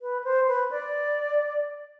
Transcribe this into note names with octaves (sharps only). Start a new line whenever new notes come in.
B4
C5
B4
D5